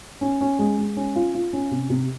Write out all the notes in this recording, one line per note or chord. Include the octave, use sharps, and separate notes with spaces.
C#4
C#4
G#3
G#3
C#4
F4
F4
C#4
C3
C3